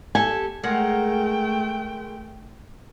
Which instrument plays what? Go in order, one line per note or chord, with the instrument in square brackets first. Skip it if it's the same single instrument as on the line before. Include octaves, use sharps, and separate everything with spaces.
[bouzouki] G4 A4 [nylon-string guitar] G#5
[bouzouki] G#3 A#4 F#5 [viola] A3 G5